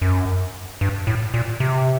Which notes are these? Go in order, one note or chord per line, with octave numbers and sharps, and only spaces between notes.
F#2
G2
A2
A#2
C3